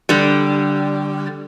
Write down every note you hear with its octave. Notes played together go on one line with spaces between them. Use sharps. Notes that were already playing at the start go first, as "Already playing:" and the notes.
D3 G3